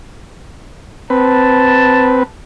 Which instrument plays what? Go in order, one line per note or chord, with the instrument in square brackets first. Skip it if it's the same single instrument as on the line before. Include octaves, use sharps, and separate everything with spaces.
[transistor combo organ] C4 B4 [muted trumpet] A5